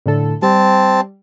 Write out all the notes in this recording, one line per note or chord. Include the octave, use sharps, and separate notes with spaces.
A2 D3 A4
G3 C4 A5